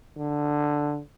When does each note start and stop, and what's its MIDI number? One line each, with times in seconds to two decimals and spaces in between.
0.17 1.00 50